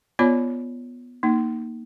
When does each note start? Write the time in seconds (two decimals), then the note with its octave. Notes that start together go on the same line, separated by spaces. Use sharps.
0.19 B3 F4 C#5 D5 B5
1.23 A#3 D#4